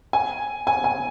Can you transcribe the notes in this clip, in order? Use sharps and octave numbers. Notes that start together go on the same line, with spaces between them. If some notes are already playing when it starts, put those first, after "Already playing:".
G#5
G#5
G#5